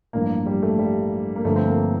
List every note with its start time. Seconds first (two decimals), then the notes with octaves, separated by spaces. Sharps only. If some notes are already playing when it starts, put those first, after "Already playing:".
0.13 A1 G2 F3 A#3
0.46 G3
0.62 A3
0.79 G3
1.36 A#3
1.44 G1 G2 D3 F3 A3
1.56 C4
1.67 A#3